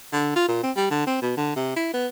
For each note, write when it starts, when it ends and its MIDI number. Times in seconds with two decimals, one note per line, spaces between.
0.13 0.33 50
0.36 0.48 65
0.48 0.60 46
0.63 0.71 60
0.77 0.89 55
0.91 1.04 50
1.07 1.17 60
1.22 1.35 47
1.37 1.53 50
1.56 1.74 48
1.76 1.90 64
1.94 2.07 59